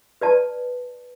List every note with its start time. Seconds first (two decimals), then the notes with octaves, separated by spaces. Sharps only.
0.21 B4 D5 A5